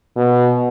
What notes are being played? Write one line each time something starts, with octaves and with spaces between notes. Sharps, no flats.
B2